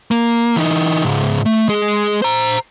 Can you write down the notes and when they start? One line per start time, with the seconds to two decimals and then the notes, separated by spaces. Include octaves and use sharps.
0.11 A#3
0.56 E3 D#4
1.04 C#2 G#2
1.46 A3
1.69 G#3 G#4
2.22 C5 A#5